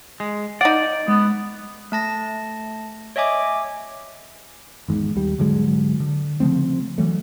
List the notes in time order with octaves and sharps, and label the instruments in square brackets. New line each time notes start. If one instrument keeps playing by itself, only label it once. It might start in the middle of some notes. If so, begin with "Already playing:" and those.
[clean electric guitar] G#3
[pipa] D#4 F#5 [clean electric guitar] D5
[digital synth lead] G#3 [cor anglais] B3
[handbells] A3 A5 A#6
C#5 D#5 E5 G#5 D6
[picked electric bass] G#1 E2 G#2
D#2 G3
G#2 D3 F#3 G#3
D3
C#3 F3 A3 C4
E3 F#3 A3